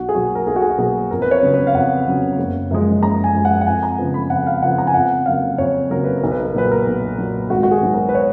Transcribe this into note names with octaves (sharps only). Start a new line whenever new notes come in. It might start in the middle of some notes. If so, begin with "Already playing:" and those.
Already playing: B1 F#4
G#4
B2 F#3 A#3 F#4
A#4
B1 G#4
F#4
G#4
B2 F#3 A#3 G#4
F2 A#4
B4
C#5
C#3 F#3 B3
B4
F5
F2 F#5
C#3 F#3 B3
F#1
F#2 F3 G#3
F#1 A#5
G#5
F#2 F3 G#3
F#5
F#5
F2 G#5
A#5
C#3 F3 B3
B5
F2 F#5
F5
C#3 F3 B3 F#5
A#5
G#5
F2 F#5
C#3 F#3 A#3 F5
F2 C#5
C#3 F#3 A#3 A#4
B4
A#4
B1
B4
A#4
A#2 F#3 B4
A#4
B1
A#2 F#3
G#1 F#4
F#4
G#4
G#2 F#3 B3
A#4
B4
C#5